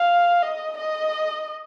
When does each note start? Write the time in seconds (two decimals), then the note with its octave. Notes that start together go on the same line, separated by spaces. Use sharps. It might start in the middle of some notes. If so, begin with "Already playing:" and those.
Already playing: F5
0.42 D#5
0.77 D#5